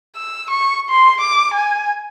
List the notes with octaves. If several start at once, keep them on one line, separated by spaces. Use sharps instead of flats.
E6
C#6
C6
D6
G#5